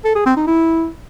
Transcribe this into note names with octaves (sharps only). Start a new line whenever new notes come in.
A4
G#4
C4
D#4
E4